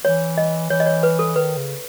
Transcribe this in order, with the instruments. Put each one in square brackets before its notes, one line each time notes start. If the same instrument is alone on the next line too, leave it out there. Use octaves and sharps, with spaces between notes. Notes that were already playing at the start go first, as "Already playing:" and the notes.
[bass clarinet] E3 [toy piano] C#5
[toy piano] D#5
[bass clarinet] E3 [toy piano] C#5
[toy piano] D#5
C#5
B4
A4
[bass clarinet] D#3 [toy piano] B4
[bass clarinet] C#3